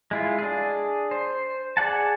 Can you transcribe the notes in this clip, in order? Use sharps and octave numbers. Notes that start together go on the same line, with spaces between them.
G#3 E4 F4
D4 G#4
C5
G#4 D5 F#5 A5